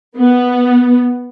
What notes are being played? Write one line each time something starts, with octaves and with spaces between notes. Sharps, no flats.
B3